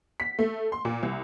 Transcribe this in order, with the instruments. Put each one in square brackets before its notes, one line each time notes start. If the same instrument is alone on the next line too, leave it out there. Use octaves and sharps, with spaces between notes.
[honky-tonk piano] B6
A3
C6
A#2
C2